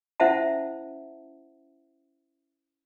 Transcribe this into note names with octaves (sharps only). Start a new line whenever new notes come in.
C#4 E4 C5 E5 F#5 A5